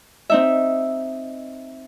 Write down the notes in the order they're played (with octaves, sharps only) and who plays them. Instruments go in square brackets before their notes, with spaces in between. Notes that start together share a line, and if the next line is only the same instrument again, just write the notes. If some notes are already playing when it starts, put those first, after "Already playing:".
[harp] C4 D#4 E5